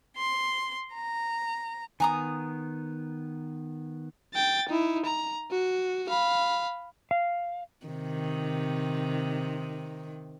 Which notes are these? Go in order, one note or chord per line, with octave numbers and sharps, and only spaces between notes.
C6
A#5
D#3 B3 G#5 A#5 D#6
G5 A6
D#4 E4
A#5
F#4
F5 B5
F5
C3 D#3